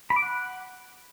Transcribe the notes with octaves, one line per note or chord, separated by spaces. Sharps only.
B5
D6
F#5